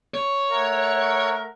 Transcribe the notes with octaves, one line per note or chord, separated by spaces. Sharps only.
C#5
A3 A#4 E5 F#5